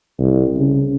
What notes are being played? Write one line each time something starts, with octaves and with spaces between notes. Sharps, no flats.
C2
C#3